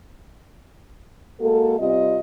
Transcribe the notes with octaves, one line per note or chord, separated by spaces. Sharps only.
G#3 A#3 F#4 A4
C3 G3 C4 F4 D#5